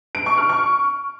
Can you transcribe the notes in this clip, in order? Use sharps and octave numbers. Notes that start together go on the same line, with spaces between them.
D7
C#6
F6
C#6